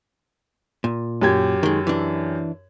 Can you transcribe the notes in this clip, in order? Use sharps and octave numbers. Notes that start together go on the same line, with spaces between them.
A#2
F#2 G4 G#6
D#3 G#3
E3 D4